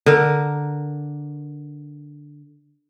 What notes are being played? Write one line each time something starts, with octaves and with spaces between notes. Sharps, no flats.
D3 A#4